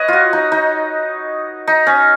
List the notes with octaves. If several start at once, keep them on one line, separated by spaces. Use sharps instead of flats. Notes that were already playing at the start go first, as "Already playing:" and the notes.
Already playing: B4 C#5 D#5
F4 F#4
D#4
D#4
D#4
C#4